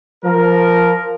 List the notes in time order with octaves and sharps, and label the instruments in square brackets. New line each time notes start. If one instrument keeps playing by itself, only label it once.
[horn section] F3 A#4